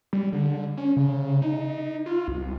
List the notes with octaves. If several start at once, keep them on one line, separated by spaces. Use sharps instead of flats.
G3
D3
C#4
C#3
D#4
F4
C2